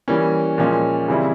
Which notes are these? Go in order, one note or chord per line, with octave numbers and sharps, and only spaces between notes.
E3 G3 A#3 C#4
A#2 F3 G#3 C#4
C#3 E3 G3 C4 E4